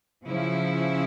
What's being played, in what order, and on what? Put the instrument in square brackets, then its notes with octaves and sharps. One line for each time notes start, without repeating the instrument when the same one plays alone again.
[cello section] C#3 F3 C#4 E4